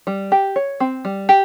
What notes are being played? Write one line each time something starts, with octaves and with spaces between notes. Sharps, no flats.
G3
G4
C#5
C4
G3
G4